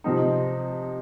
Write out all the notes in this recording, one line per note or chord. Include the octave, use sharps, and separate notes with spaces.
C3 F3 C4 D#4